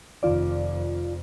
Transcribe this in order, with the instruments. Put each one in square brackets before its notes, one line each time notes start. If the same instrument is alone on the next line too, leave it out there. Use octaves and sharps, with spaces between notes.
[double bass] F1 F2 [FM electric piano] D#3 F4 D5